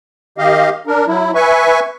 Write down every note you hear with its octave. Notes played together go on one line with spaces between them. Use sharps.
D#3 G4 D#5 F5
D4 A#4
F#3 E4
B4 E5 G#5 C#6